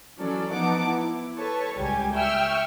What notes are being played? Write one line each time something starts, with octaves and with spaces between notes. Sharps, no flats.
E3 F#3 C#4 A4 D5
F3 B3 D#4 F#5 A5 D6
E4
A4 B4 C#5 A5 C#6
C#2 G3 G4 G#5
E5 G5 C#6 E6 F6